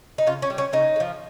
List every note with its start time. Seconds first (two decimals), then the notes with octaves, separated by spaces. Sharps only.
0.18 D#4
0.27 C#3 F4
0.42 C#4
0.50 G3
0.58 C#4
0.73 C#3 D#4
0.96 G#3
1.00 F3